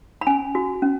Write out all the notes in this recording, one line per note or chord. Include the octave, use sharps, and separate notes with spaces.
B5
C#4 G#5
F#4
C#4